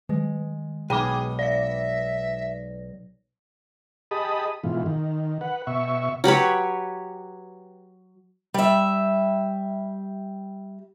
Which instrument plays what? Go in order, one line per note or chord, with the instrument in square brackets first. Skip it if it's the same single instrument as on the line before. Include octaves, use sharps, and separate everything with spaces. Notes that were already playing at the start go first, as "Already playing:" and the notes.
[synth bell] D#3 [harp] G#3
[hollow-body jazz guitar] B1 [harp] D#4 B4 [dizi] G#4 [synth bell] G5 B5 D6
[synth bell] D5 A#6 [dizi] E5
[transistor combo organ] G4 G#4 D#5 A5 B5 D#6
G#2 B2 E3 F4
D#3
B4 F#5
B2 E5 C#6
[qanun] F#3 G4 B4 C#5
[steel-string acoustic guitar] G3 E5